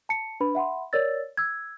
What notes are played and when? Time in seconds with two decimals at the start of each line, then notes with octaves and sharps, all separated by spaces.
0.09 A5 C#7
0.40 D4 B4 B5
0.55 E5 F#5 B5 C6
0.93 A#4 C#5 D5 E6 A6
1.37 E6 G#6